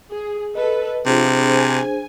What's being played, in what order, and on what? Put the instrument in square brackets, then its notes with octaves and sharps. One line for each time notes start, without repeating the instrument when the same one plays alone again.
[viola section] G#4
[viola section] A4 B4 [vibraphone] D#5
[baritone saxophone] C3 [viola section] F3 [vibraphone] D4 G#4 C5
[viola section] G#5